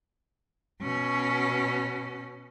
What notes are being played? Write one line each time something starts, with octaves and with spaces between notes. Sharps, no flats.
B2 C#4